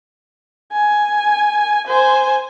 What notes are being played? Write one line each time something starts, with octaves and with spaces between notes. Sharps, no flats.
G#5
C5 G#5